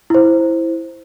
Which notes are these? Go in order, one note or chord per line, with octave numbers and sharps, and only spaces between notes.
E4 C5